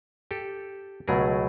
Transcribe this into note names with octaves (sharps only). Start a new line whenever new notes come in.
G4 A4
C#2 B2 F#3 A3 G#4 A#4